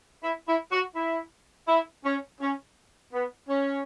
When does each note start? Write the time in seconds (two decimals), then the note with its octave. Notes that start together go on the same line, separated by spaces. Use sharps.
0.23 E4
0.48 E4
0.71 F#4
0.95 E4
1.68 E4
2.05 C#4
2.41 C#4
3.13 B3
3.49 C#4